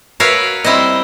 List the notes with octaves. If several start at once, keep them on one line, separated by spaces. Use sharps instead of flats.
F#4 A#4 B4 C#5 E5 F5
G3 C4 E4 C5 D#5